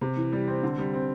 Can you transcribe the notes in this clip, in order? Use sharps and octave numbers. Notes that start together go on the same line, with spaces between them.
C3
E3
G3
C4
D3
G3
C4